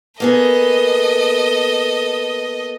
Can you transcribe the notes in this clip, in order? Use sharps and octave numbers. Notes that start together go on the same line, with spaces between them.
A#3 B3 G#4 A4 D#5